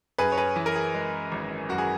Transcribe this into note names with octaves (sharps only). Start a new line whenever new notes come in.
F#2 G#4 B4
C#5
G#4 B4
E3
A#4
G#4
G#3
G#1
F#2 F#4
G#4